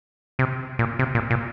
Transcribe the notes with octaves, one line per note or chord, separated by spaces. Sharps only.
C3
A#2
C3
A#2
A#2